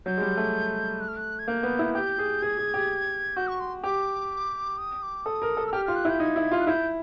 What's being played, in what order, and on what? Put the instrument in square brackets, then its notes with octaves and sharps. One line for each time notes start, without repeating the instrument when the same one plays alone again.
[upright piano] F#3 [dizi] G6
[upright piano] G#3
G3
A3
[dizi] F#6
F6
F#6
G#6
[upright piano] A#3 [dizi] G6
[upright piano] B3
E4
[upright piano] G4 [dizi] G6
[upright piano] G#4
[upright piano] G#4 [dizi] G#6
[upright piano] G#4
G4
[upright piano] F#4 [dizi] G6
[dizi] C#6
C6
[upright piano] G4 [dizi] D6
[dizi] D#6
D6
[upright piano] A4 [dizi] D#6
[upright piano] A#4
A4
[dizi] E6
[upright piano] G4 [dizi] F6
[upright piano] F4 [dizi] F6
[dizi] F#6
[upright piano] E4
[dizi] G6
[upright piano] D#4 [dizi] G#6
[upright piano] E4
F4
[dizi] F#6
[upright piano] E4 [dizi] G6